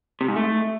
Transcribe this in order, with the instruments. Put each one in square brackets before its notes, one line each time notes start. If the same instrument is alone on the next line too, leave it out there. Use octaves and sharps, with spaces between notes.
[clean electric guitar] C3
G#2
A3